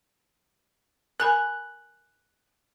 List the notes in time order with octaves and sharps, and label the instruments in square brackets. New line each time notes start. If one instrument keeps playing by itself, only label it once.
[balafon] A#4 G#5 B5 [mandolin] F#6